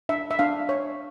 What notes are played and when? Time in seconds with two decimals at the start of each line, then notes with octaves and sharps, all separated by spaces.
0.09 D4 E5
0.31 E5
0.39 D4 F5
0.69 C#5